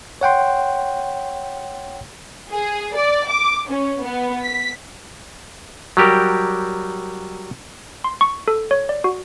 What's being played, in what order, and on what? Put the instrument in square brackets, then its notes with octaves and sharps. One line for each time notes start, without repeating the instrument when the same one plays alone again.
[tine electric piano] C#5 F#5 G5 C6
[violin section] G#4
D5
D6
C#4
B3
B6
[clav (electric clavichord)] F#3 G3 G4 A#4
[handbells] C6
C#6
A4
C#5
D5
F#4